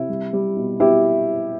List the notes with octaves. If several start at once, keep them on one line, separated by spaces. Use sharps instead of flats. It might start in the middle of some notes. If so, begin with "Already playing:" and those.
Already playing: C3 E4
G3
G3
B2
B2 E4 G4